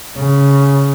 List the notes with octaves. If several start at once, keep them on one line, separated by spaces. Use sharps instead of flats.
C#3